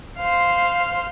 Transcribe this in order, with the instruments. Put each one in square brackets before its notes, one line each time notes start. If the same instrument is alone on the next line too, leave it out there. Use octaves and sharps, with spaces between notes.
[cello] C5 F5